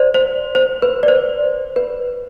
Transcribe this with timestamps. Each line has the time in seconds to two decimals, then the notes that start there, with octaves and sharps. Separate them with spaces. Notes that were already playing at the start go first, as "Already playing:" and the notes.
Already playing: C5 D5
0.14 C5
0.55 C5
0.82 B4
1.03 D5
1.08 C5
1.76 B4